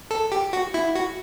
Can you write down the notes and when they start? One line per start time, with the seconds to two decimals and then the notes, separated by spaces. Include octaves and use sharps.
0.11 A4
0.32 G4
0.53 F#4
0.74 E4
0.95 F#4